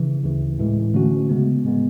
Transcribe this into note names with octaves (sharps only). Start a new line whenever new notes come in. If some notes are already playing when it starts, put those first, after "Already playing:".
Already playing: C#3 E3
D2 C#3 E3
A2 E3 G#3
D3 A3 C#4 F#4
C#3 G#3 B3
A2 G#3 B3